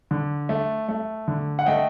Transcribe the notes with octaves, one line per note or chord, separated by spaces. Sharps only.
D3
A3
A3
D3
F#5
A3 D#5 G5